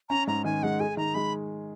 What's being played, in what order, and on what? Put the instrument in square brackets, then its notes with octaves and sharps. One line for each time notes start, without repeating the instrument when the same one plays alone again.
[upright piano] C#4 [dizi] A#5
[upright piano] G#2 [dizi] A#5
[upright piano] D#3 [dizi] G#5
[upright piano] G#3 [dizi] F#5
[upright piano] G#4 [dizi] G#5
[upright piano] D#3 [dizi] A#5
[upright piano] G#3 [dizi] B5